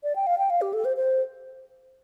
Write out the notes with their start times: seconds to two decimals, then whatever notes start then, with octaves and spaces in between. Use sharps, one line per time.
0.03 D5
0.15 G5
0.26 F5
0.38 G5
0.50 F5
0.61 G4
0.73 A4
0.85 C5
0.96 C5